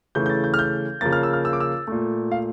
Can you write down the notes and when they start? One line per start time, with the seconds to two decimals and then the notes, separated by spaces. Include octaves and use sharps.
0.15 C#3 E3 A3 G6
0.26 G6
0.30 A6
0.44 G6
0.54 F6
0.59 G6
1.01 C#3 F3 A#3 A6
1.12 F6
1.23 E6
1.33 F6
1.45 E6
1.53 D6
1.60 E6
1.87 A#2 A3
2.32 F5